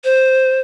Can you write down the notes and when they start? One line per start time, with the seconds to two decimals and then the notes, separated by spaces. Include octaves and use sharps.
0.04 C5